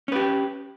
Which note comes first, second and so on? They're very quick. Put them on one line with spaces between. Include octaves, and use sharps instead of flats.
C#4 B4 G4